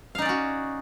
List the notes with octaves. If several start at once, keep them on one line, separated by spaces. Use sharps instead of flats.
C#4 D#4 F#4 D5 F5